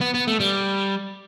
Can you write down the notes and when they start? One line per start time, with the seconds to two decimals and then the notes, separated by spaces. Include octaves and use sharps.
0.01 B3
0.14 B3
0.27 A3
0.40 G3